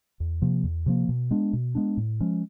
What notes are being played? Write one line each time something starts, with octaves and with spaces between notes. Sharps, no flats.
E2
C3 F3 A#3
E2
C3 F3 A#3
B2
G#3 B3 D4
B2
G#3 B3 D4
A2
F3 G#3 C#4